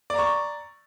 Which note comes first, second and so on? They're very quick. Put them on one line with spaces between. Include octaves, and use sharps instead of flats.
D5 A#5 C#6